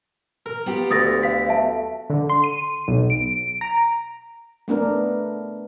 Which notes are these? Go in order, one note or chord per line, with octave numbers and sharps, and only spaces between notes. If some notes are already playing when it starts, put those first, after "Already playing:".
A#4
B3 F4 G4
D2 D#6 A6 A#6
F5 B6
E5 A5
D3
C6
D#7
B1
D7
A#5
A3 B3 D4 A#4